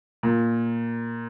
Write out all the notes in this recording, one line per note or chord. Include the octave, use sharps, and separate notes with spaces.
A#2